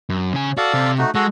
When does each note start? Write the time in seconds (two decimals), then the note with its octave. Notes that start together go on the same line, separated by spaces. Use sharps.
0.10 F#2
0.33 C#3 G#5
0.57 F#4 A4 D5 F5
0.74 C3 G4
0.98 A3 D#4 F#4
1.15 G#3 F#4 A4